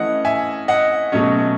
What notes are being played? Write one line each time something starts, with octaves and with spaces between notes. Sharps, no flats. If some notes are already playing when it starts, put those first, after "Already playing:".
Already playing: E3 A3 C#4 D#5 F#5
E5 G#5
D#5 F#5
B2 F#3 A3 C#4 D#5